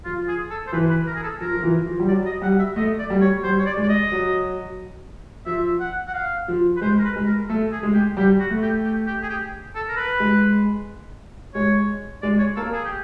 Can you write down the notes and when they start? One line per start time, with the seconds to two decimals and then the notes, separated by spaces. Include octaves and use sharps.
0.05 F3 F4
0.28 G#4
0.51 A4
0.67 C5
0.73 E3 B4
0.90 B4
1.07 A#4
1.16 G#4
1.23 A4
1.41 F3 A#4
1.57 F3
1.63 E3
1.86 F3
2.00 G3
2.08 F#3 D5
2.26 D#5
2.42 G3 F#5
2.59 E5
2.76 A3 D#5
2.99 D5
3.10 G3
3.21 C#5
3.44 G3 C5
3.59 C#5
3.66 D5
3.77 G#3
3.83 D5
3.89 D#5
4.12 F#3
5.46 F3 E5
5.80 F#5
6.08 F#5
6.14 F5
6.48 F3
6.76 B4
6.82 G#3 C5
6.99 A#4
7.04 B4
7.16 G#3
7.26 A#4
7.49 A3 A4
7.72 G#4
7.83 G#3
7.94 G4
8.17 G3 G4
8.40 F#4
8.50 A3
8.62 G4
8.84 G4
9.07 G4
9.23 G#4
9.29 G4
9.75 A4
9.88 A#4
9.97 B4
10.20 G#3
11.55 G#3 C#5
12.22 G#3 D5
12.39 C#5
12.56 A#3 A4
12.73 G#4
12.85 G4